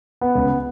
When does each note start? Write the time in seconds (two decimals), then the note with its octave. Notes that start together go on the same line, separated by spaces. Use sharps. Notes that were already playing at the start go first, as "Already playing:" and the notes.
0.21 B3
0.35 C#2